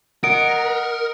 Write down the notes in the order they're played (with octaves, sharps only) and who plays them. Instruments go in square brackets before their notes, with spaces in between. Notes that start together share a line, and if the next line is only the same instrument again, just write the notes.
[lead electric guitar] A#4 [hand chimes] D#5 F#5 [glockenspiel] D#6 C#7 [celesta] D7